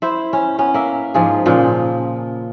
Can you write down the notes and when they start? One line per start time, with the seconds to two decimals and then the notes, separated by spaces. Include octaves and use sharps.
0.02 E4 C5
0.33 C#4
0.59 B3 C#4
0.74 A#3 E5
1.14 G#2 F3 F4 G#4
1.46 A#2 C#3 F3